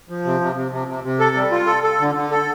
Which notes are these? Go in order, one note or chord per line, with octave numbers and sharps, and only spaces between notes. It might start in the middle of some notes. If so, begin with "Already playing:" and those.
F3
C3
C3
C3
C3
C3
C3
A4
G3
F4
A4
A4
D3
D3
A4